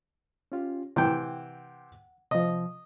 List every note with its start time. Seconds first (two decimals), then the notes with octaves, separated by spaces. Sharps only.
0.52 C#4 F4 G4
0.96 C3 E3 F#5 G5
2.31 C3 F3 D#5